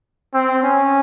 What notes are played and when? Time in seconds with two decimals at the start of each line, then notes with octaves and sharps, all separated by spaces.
0.34 C4
0.63 C#4